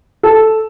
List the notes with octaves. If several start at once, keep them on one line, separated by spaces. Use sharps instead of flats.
A4